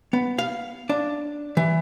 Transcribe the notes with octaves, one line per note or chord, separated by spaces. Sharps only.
B3
F5
D4
E3